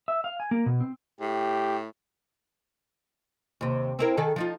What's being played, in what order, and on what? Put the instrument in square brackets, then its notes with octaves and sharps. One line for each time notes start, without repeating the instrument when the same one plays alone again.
[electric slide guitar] E5
F5
G#5
A#3
B2
C4
[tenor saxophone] A2 [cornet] G4
[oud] D#2 C3
C4 E4 A#4
D#3 G#4 A4
F3 D#4 F4